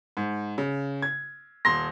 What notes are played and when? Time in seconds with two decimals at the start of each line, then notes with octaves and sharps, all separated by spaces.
0.17 G#2
0.58 C#3
1.02 G#6
1.65 D#1 C6 A#6